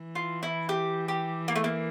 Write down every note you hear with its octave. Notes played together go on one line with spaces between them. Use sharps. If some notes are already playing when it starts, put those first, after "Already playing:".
Already playing: E3
F4
E4
G4
G4
A#3
A3
A#3